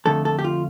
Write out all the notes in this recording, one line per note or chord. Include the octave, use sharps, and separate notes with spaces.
F2 D3 A3 A4
A4
G4
F4